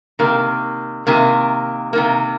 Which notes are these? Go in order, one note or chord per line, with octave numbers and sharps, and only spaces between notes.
C3 D#3 A#3
C3 D#3 A#3
C3 D#3 A#3